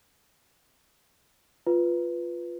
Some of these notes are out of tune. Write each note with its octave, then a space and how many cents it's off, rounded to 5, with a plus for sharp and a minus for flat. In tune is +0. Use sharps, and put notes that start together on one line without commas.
F4 +0 B4 +0